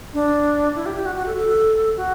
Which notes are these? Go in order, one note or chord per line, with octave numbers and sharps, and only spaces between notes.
D4
E4
G4
G4
F#4
F#4
A4
A4
F#4